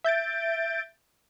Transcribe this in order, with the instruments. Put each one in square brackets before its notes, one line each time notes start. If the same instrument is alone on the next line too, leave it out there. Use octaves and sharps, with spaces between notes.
[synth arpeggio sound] E5 G6 A6 D7